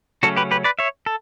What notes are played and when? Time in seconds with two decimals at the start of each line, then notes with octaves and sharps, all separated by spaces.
0.23 C#3 F#3 A3 C#4 F#4 A4
0.37 G4 B4
0.51 G4 B4
0.64 B4 D5
0.79 C#5 E5
1.06 A4